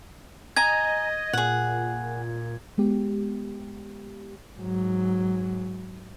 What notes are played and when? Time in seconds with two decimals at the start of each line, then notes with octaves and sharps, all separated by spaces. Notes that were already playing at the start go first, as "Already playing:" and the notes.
0.56 D#5 G#5 A#5 G#6
1.33 A#2 G#4 F#5
2.78 G#3 B3 G4
4.59 G#2 F#3